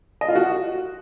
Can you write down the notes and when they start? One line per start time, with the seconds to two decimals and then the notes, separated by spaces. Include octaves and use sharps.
0.21 D#5
0.28 F4
0.35 F#4